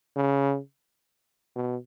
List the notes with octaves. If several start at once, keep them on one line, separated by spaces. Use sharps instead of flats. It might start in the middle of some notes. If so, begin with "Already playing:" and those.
C#3
B2